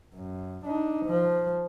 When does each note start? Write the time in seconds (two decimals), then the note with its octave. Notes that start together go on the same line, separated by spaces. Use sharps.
0.15 F#2
0.66 D4 D#4
1.06 F3